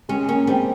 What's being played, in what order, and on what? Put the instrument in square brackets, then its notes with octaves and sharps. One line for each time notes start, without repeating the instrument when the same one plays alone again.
[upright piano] G#3 [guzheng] C#4
[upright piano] A#3 [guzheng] C#4
[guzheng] G3 [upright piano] G#3 C4